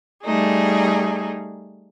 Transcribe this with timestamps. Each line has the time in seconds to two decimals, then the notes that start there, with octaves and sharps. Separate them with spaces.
0.23 G3 A3 D#4 G#4